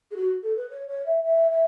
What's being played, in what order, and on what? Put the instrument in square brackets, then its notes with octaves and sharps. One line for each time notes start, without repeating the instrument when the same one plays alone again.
[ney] G#4
F#4
A4
B4
C#5
C#5
E5
E5
E5